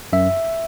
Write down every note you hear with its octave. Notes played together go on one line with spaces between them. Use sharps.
F#2 E5